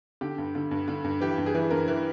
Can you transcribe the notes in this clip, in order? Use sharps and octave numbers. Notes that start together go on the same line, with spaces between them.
D3 G4
G2
D3
G2
D3
G2
E3 G4
G2
G#4
E3
G2 A#4
E3